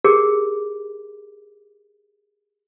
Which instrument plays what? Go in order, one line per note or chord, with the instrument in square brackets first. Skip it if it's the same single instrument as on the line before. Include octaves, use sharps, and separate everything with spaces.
[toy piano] G4 G#4 A#4 D6